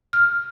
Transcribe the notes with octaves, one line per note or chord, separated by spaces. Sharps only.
F6